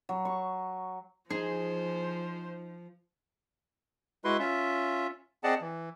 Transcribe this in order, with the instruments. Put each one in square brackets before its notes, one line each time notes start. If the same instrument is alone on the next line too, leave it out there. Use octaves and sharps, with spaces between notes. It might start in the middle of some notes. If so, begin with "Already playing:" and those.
[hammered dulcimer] F#3
C#6
[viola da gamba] F3 [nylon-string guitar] D#4 [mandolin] G#4 [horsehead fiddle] C5
[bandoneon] G#3 E4 F#4 B4 C6
C#4 F4 E5
C4 G#4 D5 D#5 F#5 A5
E3